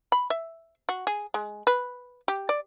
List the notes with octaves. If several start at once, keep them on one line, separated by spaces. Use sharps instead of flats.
B5
E5
F#4
G#4
G#3
B4
G4
D5